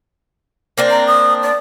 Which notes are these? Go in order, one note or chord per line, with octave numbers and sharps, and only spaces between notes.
A#3 C4 D4
A#5
D#6
D5